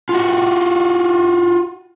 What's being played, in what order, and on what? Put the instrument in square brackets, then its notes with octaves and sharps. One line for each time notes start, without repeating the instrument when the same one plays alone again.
[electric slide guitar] F4 F#4